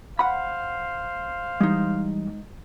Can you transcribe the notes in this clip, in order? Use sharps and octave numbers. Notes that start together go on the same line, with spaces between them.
C5 F5 F#5 B5
E3 G3 G#3 D#4